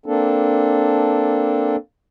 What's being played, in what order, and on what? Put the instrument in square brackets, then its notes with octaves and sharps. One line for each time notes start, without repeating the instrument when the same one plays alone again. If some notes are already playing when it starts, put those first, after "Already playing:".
[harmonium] A#3 C4 D4 A4